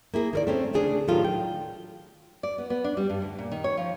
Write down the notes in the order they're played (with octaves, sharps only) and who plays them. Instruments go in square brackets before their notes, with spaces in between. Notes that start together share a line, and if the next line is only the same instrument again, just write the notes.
[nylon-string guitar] A#3 E4 G#4
D#3 A#4 D5
A3 C4 C#4
D2 C#3 D4 G#4 C#5 D5
A2 D#3 F#3 F4 G4 A4
G5
D5
B3
B3
D4
G3
G2
D2
A#2
D#3
C#5
F3